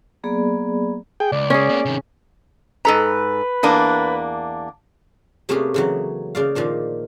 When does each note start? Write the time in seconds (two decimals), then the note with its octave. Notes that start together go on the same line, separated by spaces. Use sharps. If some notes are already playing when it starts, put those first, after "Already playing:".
0.24 F#3 A#3 B3 G#4 D5 B5
1.20 G#4 G5
1.32 C#2 D5
1.50 C#4 G#4
1.69 A#3 B3
1.85 C3 D#3
2.85 G#2 A4 B4 A#5
3.63 E2 A#3 D4
5.49 C3 A3 A#3 C#4 G4 G#4
5.74 C#3 E3 F#3
6.35 C#3 D5 F5
6.55 A#2 D#3 F3 D4